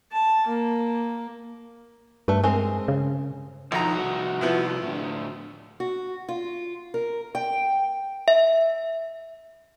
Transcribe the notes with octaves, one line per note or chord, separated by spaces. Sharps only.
A5
A#3
G2 A3 B4
G#3 C4 A#4
C#3
B1 D#3 F3 A#5
C2 F#4
F3 B3 E4
A2 D3
F#4
F4
A#4
G5
E5